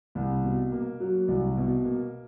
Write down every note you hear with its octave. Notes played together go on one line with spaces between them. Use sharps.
C2
B2
A#3
F#3
C2
B2
A#3